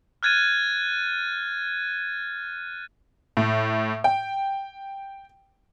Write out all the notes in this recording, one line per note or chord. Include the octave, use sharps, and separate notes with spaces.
F6 F#6 G#6 A6 D#7
A2
G5